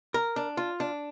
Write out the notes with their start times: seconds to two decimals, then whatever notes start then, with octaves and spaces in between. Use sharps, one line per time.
0.14 A#4
0.36 D4
0.57 F4
0.80 D4